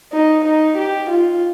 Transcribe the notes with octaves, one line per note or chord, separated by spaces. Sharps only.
D#4
D#4
G4
F4